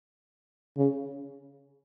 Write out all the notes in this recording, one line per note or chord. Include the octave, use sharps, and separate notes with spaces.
C#3